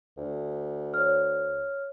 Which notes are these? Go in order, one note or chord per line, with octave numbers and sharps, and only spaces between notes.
D2
C#5 F6